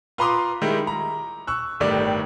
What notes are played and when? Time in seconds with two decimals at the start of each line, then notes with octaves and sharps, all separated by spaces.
0.18 F4 B4 A#5 C6 D6 D#6
0.62 D#3 G3 G#3 E4
0.87 A#5
1.47 C#6 E6 F#6
1.80 G1 A2 D#3 G3 D5